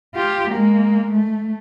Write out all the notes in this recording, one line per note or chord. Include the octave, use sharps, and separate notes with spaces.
F4 G4
G#3 A#3
A3